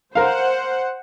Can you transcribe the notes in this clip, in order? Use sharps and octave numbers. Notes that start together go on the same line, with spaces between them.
A#4 C5 F5 F#5